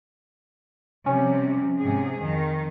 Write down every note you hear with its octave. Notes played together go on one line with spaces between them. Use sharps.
C3 F3 G3 C#4
G#2 C3 G#4
F2 D#3